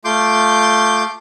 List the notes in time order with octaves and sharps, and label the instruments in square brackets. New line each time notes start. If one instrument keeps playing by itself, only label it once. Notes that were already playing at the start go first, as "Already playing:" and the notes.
[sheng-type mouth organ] A3 F4 C6 D6 G6